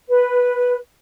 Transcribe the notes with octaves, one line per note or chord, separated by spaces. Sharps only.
B4